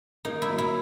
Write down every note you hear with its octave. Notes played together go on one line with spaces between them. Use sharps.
A#3 D#4
E4
F#3
E4